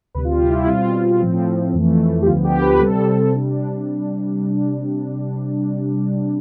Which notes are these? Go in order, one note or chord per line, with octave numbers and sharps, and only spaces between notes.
D2 C3 G3 B4
F4
G4
E4
B2 G3 C4 F4
A2 F3 C4
F2 E3 A3
G4
D2 D3 F3 B3 F4
G4
B4
G4
C3 G3 C4 A4
C3 G3 D4